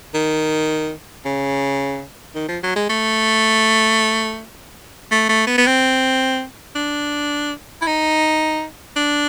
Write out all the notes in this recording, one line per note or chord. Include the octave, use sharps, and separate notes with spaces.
D#3
C#3
D#3
F3
F#3
G#3
A3
A3
A3
B3
B3
C4
D4
E4
D#4
D4